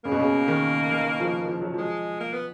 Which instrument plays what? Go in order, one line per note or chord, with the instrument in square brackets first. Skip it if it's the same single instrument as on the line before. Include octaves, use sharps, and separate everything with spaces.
[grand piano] C#3 [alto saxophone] A#3
[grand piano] B2
C#3
D#3
D#3
F3
F3
F#3
[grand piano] F3 [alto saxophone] G#3
[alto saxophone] A#3
B3